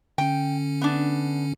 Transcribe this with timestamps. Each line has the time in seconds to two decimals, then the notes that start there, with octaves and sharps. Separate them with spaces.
0.18 D3 C#4 G5
0.81 B3 D4